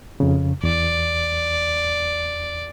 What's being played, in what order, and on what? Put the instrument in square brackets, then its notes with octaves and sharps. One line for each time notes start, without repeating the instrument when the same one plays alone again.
[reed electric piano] F2 C#3
[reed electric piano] E2 [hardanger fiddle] D5